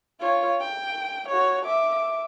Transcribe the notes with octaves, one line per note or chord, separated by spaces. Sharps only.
F4 C#5
G5
F#4 C#5
E5 D6